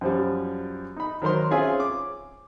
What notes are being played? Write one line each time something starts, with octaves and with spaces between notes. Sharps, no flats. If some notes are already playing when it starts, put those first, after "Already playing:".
F#2 F3 G3
D#4 B5
D#3 F#3 A#4 C5 C6
C4 C#4 F4 G#4 E5 G#5
D6